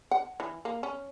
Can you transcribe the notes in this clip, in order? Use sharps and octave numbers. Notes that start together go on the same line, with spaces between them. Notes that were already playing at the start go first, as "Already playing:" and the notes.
F#5
E3
A#3
C#4